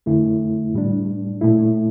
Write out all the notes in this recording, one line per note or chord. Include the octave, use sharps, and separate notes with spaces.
F2 D3 A3 E4
A2 G3 D4
A#2 A3 E4